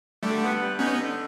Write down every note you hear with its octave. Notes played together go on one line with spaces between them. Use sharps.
D3 G3 A3
B3
G3
B3 C#4 D#4
D3